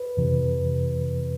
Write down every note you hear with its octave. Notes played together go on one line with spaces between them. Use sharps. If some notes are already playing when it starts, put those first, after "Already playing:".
Already playing: B4
F2 C3 E3